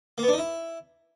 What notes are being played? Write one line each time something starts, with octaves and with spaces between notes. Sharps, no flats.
A#3
B3
D4
D#4
E4